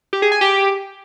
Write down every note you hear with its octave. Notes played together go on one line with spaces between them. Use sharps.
G4
G#4
G#5
G4